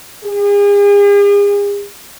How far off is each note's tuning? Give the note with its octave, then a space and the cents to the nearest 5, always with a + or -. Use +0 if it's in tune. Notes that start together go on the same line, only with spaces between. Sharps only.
G#4 -40